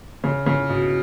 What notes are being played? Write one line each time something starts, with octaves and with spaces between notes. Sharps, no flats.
C#3
C#3
B2